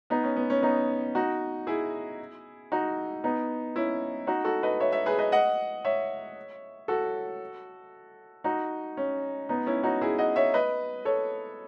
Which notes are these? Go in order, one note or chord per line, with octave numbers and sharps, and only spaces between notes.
B3 D#4
C#4
B3
C#4
B3 D#4
D#4 F#4
E4 G#4
D#4 F#4
B3 D#4
C#4 E4
D#4 F#4
F#4 A4
B4 D#5
C#5 E5
C#5 E5
G#4 B4
B4 D#5
D#5 F#5
C#5 E5
F#4 A4
D#4 F#4
C#4
B3 D#4
C#4 E4
D#4 F#4
E4 G#4
D#5 F#5
C#5 E5
B4 D#5
A4 C#5